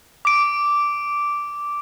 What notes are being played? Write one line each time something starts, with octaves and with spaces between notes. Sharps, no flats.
D6 D7